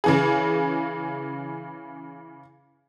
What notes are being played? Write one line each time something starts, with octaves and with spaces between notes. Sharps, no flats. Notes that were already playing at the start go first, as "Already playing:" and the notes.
C#3 E3 G#4